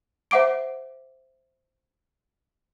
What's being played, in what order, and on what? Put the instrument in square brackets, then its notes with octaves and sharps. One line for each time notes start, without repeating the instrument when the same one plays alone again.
[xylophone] C5 E5 F#5 D6 D7